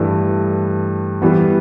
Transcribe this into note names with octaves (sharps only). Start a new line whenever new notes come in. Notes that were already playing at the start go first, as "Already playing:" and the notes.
Already playing: G2 E3 A3
E3 G3 B3